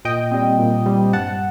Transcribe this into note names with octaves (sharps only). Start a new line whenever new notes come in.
A#2 D#5 G5
G3 C4
A#2
G3 C4
G2 F#5 A5